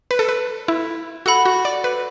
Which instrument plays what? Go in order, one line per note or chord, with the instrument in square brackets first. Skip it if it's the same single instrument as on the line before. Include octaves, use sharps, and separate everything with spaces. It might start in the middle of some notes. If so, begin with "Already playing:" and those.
[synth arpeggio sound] B4
A4
B4
E4
[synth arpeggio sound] F#4 [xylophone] A4 F#5 B5
[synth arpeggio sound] F#4
D5
B4